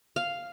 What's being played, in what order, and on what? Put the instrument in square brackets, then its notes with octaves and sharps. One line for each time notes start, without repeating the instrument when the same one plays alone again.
[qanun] F5